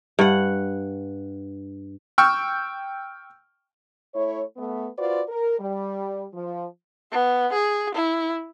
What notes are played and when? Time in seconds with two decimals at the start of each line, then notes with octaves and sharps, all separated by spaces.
0.19 G2 F#5
2.18 G5 C#6 E6 F6
4.14 A3 E4 C#5
4.57 A3 B3
4.98 F4 F#4 B4 C5 D5
5.29 A#4
5.59 G3
6.34 F3
7.12 B3
7.53 G#4
7.95 E4